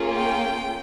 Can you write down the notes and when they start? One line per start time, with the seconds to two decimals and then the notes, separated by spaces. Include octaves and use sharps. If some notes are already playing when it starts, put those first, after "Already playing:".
Already playing: A#3 C#4 F4 G#4
0.14 G5